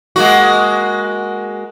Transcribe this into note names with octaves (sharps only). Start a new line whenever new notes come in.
G#3 A#3 F#4